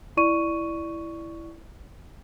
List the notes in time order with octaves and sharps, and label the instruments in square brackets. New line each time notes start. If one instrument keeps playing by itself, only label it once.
[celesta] E4 D5 C#6 D#7